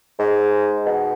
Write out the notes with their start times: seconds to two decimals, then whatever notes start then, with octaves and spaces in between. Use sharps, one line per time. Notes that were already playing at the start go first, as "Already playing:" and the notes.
0.19 G#2
0.86 B2